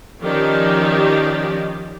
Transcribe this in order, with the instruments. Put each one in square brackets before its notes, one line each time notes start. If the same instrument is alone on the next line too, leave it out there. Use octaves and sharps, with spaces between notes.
[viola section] D#3 F3 C#4 D#4 G4 D5